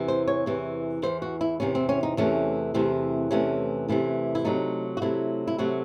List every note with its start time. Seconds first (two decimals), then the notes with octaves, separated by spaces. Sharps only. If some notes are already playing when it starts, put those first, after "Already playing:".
Already playing: E2 C3 E3
0.08 C5
0.28 C#5
0.46 E2 C3 E3
1.03 E2 C3 E3 C5
1.22 F#4
1.41 E4
1.60 E2 C3 E3 C#4
1.75 C4
1.89 C#4
2.03 D#4
2.17 E2 C3 E3 A3 C#4
2.74 E2 C3 E3 A3 C4
3.31 E2 C3 E3 A3 C#4
3.88 E2 C3 E3 A3
4.35 E4
4.45 C3 F#3 A3 D#4
4.97 F#4
5.02 C3 F#3 A3 E4
5.47 E4
5.58 C3 F#3 A3 F#4